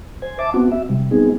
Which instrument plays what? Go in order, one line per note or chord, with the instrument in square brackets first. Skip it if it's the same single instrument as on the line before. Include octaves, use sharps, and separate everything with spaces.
[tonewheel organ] C5 G#5
E5 A5 D6
B3 C4 F#4
E5
C3 G3
G3 B3 C4 D#4 G#4